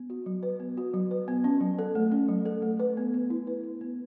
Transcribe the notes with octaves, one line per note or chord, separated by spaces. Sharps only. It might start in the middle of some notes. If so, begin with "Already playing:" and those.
Already playing: B3
F#4
F#3
B4
B3
F#4
F#3
B4
B3
C#4
F#3
A4
A3
C#4
F#3
A4
A3
B4
B3
B3
E4
B4
B3
B3